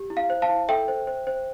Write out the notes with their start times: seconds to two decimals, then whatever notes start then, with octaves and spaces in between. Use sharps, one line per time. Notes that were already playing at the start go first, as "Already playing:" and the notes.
Already playing: G4
0.10 E4
0.17 F5
0.30 C5
0.42 F5 A5
0.49 E4
0.68 A4 E5 G5
0.88 C5
1.07 C5
1.27 C5